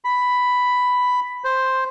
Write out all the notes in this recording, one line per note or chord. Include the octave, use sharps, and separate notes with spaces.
B5
C5